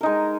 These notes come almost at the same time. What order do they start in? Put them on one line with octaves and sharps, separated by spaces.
A#4 D#4 G#3